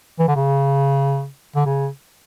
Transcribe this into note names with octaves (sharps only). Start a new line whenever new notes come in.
E3
D3
C#3
D3
C#3